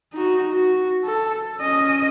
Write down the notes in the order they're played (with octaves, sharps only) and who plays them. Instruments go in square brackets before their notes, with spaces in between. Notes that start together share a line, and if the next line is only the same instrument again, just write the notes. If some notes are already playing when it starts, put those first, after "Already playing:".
[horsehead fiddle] D#4 F#4
F#4
A4
C#4 D#5